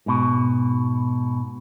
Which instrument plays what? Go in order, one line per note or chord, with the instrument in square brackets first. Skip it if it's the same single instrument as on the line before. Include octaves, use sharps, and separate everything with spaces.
[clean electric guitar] G#2 B2